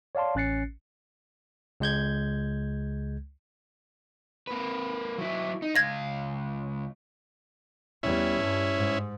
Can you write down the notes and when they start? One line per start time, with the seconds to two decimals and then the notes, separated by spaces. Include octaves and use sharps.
0.15 C#5 D5 F5 A5 C6
0.35 A1 C#4 F#6 A6 C7 C#7
1.80 C#2 G#3 G6 G#6
4.47 A#3 B4
5.18 F#3 E4
5.62 D#4
5.76 C#2 F5 G#6 A#6
8.03 E2 G3 C#4 E4
8.39 G2
8.75 G#2